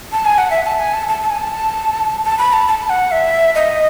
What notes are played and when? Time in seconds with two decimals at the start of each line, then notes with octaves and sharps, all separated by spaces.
0.12 A5
0.25 G#5
0.38 F#5
0.51 E5
0.64 A5
0.79 G#5
0.93 A5
1.09 A5
1.23 A5
1.30 G#5
1.38 A5
2.24 A5
2.39 B5
2.53 A5
2.68 A5
2.90 F#5
3.11 E5
3.55 D#5